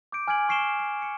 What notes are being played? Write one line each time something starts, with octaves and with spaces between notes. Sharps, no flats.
D6 G6 D7
G#5 F6 G6 G#6 D7 F#7
C#6 F6 C7 D7 E7 G7
C7
C#7